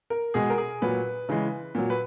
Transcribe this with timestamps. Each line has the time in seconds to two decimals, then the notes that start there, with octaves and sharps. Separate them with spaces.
0.10 A#4
0.34 B2 G#3 G#4
0.50 A#4
0.58 G#4
0.82 A#2 F#3 B4
1.29 C#3 E3 G#3
1.75 A#2 F#3
1.90 B4